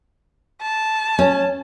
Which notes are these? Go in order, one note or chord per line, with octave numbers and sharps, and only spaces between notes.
A5
C#4